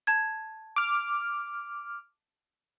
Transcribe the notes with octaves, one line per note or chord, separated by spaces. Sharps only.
A5 G#6
D6 F6